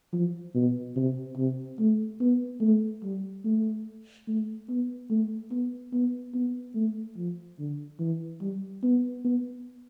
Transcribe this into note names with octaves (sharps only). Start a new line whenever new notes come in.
F3
B2
C3
C3
A3
B3
A3
G3
A3
A3
B3
A3
B3
B3
B3
A3
F3
D3
E3
G3
B3
B3